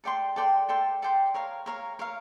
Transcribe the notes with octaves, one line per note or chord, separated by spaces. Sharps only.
A4 D5 G5 C6
A4 D5 G5 C6
A4 D5 G5 C6
A4 D5 G5 C6
A#4 C#5 F5
A#4 C#5 F5
A#4 C#5 F5